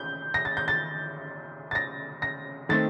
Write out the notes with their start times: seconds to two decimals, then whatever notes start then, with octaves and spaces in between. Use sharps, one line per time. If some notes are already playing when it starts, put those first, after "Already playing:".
Already playing: G6
0.34 A#6
0.45 A6
0.57 G6
0.68 A6
1.71 A6
1.75 A#6
2.22 A#6
2.69 D#3 A3 C4 A6